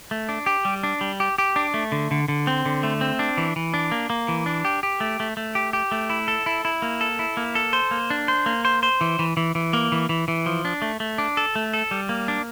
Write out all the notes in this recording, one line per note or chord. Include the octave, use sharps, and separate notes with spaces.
A3
D4
G4
G3
D4
G3
G4
G4
D4
A3
D3
D3
D3
C4
D3
A3
C4
D4
E3
E3
D4
A#3
A#3
E3
D4
G4
G4
A3
A3
A3
G4
G4
A3
E4
A4
E4
E4
A#3
A4
E4
A#3
A4
C5
A#3
D4
C5
A#3
C5
C5
E3
E3
E3
E3
A#3
E3
E3
E3
F3
D4
A3
A3
D4
A4
A3
A4
G3
A#3
D4